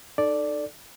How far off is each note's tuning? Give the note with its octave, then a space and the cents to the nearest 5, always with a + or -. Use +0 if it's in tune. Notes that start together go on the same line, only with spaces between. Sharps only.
D#4 -30 A4 +0 D5 +0